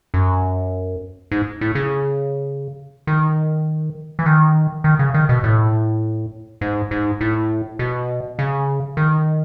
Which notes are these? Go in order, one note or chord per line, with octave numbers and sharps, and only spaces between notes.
F#2
G#2
A2
C#3
D#3
E3
D#3
D#3
C#3
D#3
B2
A2
G#2
G#2
A2
B2
C#3
D#3